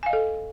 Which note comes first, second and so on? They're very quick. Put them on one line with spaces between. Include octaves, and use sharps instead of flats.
G#5 F5 D#5 A4